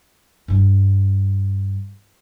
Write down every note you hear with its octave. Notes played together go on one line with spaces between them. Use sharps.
G2 G3